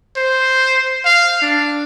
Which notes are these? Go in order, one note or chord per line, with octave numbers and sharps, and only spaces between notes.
C5
F5
D4